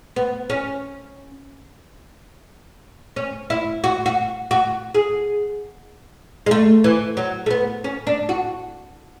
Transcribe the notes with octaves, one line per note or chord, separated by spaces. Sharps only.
B3
C#4
C#4
E4
F#4
F#4
F#4
G#4
G#3
A3
E3
F#3
A3
B3
C#4
D4
F#4